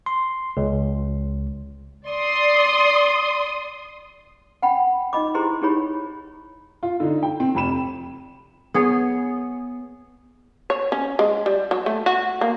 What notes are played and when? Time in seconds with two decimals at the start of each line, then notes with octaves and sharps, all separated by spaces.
0.06 C6
0.57 C#2
2.07 D5 C6 D#6
4.63 F#5 G5 B5
5.13 D#4 F4 D#5 B5 D6
5.34 E4 G4 G#4 C5 A#5 C6
5.62 D#4 E4 G4 G#4 C#5 B5
6.83 F4
7.00 D3 D#4
7.23 G5
7.40 C4
7.55 F1 B5 E7
8.74 B3 G#4 C#5
10.70 C#5
10.92 C#4
11.19 G#3
11.46 G3
11.71 F#3
11.86 A3
12.06 F#4
12.41 A#3